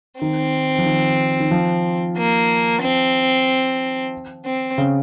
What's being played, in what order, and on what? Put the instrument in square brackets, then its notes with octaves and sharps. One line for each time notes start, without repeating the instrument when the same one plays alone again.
[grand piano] D#3 [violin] C4
[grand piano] F3
D#3
D#3
F3
[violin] A#3
C4
C4
[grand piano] C#3